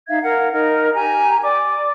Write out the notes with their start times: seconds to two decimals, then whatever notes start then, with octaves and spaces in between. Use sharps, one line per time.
0.08 D#4 E5 F5 G#6
0.21 A#4 F5 F#5
0.51 D#4 A#4
0.93 G4 G#5 A#5
1.43 D5 D6